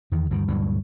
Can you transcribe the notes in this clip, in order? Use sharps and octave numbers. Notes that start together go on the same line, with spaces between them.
E2 D#3
D2 G2 D3 D#3
D2 G2 A#2 F#3